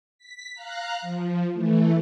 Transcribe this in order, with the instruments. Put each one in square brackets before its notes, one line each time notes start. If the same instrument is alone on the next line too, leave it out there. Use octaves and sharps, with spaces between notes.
[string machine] B6
F5 A#5 F#6
F3
E3 A3